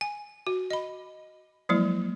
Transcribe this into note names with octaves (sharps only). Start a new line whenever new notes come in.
G#5
F#4
D#5 B5
F3 F#3 G#3 A#3 E4